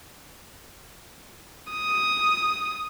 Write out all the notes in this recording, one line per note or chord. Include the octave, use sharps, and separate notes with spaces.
D#6